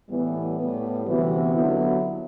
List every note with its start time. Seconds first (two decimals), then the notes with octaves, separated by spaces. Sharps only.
0.09 A2 E3 G3 B3
0.58 A2 G3 B3
1.06 D2 C3 E3 B3 F#4
1.53 D3 F#3 B3 E4